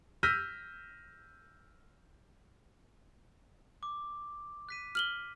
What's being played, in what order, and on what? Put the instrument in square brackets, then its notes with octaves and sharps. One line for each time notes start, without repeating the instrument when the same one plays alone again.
[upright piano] E6 F6 G6 A#6 B6 D#7
[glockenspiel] D6
F#6 B6 D#7
[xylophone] F6 F#7 G7